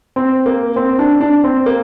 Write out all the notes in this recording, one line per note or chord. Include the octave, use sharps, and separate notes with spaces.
C4
A#3
C4
D4
D4
C4
A#3